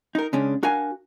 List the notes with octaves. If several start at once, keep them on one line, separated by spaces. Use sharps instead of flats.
D#4 A#4
C#3 G#3 C#4 D4
D4 F#4 A#4 F5 G#5